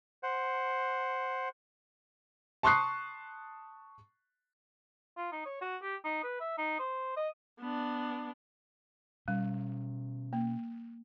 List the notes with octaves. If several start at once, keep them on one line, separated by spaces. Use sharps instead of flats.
C5 F#5
A5 C6 C#6 D#6 F#6 C7
F4
D#4
C#5
F#4
G4
D#4
B4
E5
D#4
C5
D#5
B3 D4
B2 G3 C#4
A#3